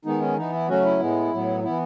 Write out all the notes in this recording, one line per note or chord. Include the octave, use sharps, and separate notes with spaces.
D#3 G#3 B3 D#4
C#4
E3 B3 D#4
E4
C#3 F#3 A3 C#4 F#4
E4
A2 G#3 B3
A2 F#3 B3
E3 B3 E4